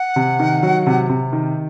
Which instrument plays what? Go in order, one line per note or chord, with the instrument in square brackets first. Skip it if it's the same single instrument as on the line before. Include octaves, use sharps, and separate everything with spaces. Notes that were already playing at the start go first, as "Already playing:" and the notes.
Already playing: [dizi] F#5
[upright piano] C3
D#3
F#3
C3
C3
D#3